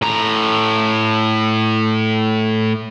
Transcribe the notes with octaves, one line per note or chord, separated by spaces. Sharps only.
A2 A#5